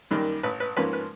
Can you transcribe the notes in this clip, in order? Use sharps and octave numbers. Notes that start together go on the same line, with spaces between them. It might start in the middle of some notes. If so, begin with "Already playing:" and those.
F#2 D#3 G3 A#3
A1 B4
B4
G#2 F3 A#3 C#4 B4
B4